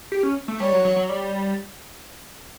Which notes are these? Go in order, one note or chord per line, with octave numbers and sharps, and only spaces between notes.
G4
C#4
A3
G3 C#5
F#3
F#3
F#3
G3